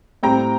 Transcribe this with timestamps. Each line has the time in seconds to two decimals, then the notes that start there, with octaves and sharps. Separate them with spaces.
0.23 A2 G3 C4 G5 A#5